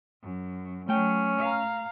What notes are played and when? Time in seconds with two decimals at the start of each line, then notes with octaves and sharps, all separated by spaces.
0.21 F#2
0.89 F#3 A3 C#4 G5
1.39 F5 A#5